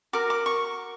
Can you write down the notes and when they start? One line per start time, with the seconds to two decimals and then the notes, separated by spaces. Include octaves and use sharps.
0.13 F#4 A#4 D6
0.30 D6
0.46 C#6